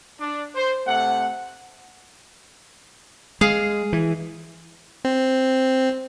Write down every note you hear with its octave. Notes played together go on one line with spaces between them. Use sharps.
D4
C5
C3 A3 F#5
G#3 G#4 F5
E3
C4